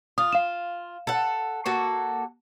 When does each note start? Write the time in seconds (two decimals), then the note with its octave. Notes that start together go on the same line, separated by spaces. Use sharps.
0.18 F4 D#6
0.33 F5 E7
1.07 A4 F#5
1.66 A#3 F#4 A4